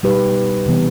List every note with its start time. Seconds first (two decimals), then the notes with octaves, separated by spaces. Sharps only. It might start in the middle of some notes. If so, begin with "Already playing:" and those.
0.03 B2 G3 D#4 G4 B4
0.66 C3 E3 B3